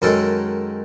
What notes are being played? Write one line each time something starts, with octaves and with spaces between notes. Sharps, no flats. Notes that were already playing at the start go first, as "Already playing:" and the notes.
F#2 D#3 G#3 A4